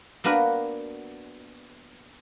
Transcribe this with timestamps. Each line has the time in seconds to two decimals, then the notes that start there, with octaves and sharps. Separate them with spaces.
0.24 A#3 B3 D4 F#4 A#4 B4